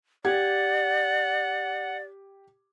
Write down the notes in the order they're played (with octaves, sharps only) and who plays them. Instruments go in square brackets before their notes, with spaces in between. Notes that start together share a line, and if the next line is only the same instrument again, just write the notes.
[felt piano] G4 G#6 [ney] D5 [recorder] F#5